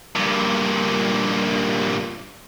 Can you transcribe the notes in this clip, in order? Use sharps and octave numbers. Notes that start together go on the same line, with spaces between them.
G2 A#2